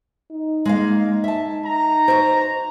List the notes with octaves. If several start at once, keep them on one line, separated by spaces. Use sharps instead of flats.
D#4
G#3 A#3 F5
E5 A5
A#5
F#4 C5